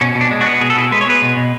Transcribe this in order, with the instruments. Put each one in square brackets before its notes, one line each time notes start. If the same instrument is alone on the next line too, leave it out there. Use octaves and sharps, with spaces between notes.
[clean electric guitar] B2 C#4
B2
D4
G#3
D4 F#4
B3
B2 G#4
A4
B2 E4 G#4
G#3 B4
C#5
B3 G#4 B4
B2
B2